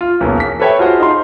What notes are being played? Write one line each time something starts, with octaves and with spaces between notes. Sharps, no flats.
F4
B1 E2 A#3 C#4 G#4
B6
A4 B4 C#5 E5 G5
F4 F#4 G#4 C5
D#4 C6